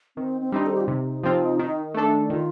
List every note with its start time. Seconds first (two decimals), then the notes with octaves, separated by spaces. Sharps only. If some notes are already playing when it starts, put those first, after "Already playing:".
0.16 D#3 C4
0.42 C4
0.52 G3 C4 D4 D#4
0.66 A4
0.74 G4
0.81 F4
0.88 C3 D#4
1.24 F3 C4 F4
1.59 D#3
1.94 A3 D4 A4
2.30 D#3 F4